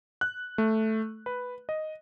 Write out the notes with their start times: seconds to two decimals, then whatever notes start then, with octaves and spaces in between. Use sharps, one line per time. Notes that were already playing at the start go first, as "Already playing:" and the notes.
0.21 F#6
0.58 A3
1.26 B4
1.69 D#5